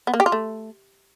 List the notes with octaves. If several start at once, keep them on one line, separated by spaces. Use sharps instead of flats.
B3
A#3
G4
F4
A3